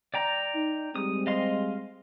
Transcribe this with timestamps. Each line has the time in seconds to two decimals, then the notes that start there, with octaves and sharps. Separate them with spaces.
0.14 D5 G5 A#5
0.55 D#4
0.96 G3 G#3 C4 D#6
1.27 D#5 F5 C6